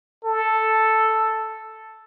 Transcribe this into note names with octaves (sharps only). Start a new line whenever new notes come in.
A4